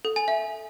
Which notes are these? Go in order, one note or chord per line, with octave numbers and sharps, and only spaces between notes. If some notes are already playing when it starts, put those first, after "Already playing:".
A4
G#5
E5